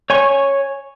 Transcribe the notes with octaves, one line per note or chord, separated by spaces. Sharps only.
C#5 G#5 C#6